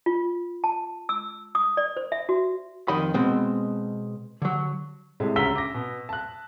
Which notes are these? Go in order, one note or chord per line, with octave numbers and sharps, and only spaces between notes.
F4
A5
E6
D#6
D5
C5
E5
F#4
F2 D#3 D#5 B5
B2 G#3 C4
D3 F#3
A2 C3 G#3
D2 C#3 A#5 E6 B6 G7
D6 A#6
B2
A5 F#6